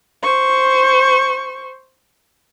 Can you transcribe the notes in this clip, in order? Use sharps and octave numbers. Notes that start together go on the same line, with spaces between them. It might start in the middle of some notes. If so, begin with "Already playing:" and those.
C5 C#6